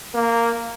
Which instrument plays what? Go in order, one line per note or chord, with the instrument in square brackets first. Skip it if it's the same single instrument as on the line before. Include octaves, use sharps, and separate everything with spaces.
[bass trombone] A#3